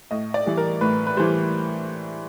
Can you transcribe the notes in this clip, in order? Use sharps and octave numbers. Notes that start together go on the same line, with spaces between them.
A2 D#5
D5
E3 G3
A#4
A2 B4
B4
E3 G3 C5